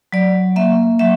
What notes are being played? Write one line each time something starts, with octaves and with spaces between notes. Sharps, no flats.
F#3 D5
A#3 E5
F#3 E5